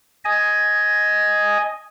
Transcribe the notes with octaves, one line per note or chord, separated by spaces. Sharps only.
D#5 G#5